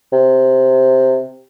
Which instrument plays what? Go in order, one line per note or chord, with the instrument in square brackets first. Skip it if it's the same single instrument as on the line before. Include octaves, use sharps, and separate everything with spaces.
[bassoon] C3